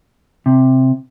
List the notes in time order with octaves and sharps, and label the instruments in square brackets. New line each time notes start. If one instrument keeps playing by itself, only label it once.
[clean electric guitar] C3